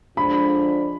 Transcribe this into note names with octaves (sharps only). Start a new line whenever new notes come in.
D3 F3 G#3 D4 B5